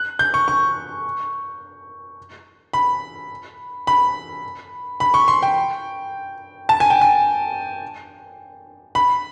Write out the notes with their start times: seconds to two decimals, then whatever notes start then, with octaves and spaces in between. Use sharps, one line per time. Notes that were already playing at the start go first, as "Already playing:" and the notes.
Already playing: F#6
0.19 G6
0.34 C#6
0.48 C#6
2.73 B5
3.87 B5
5.00 B5
5.14 C#6
5.28 C6
5.43 G5
6.69 A5
6.80 G#5
6.90 G5
7.01 G#5
8.95 B5